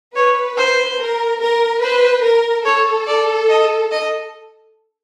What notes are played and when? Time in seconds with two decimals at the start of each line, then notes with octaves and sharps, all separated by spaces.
0.16 B4 C#5
0.58 C5
0.99 A#4
1.41 A#4
1.82 B4 C5
2.24 A#4
2.65 A4 C#5
3.07 D5
3.49 D#5
3.92 D#5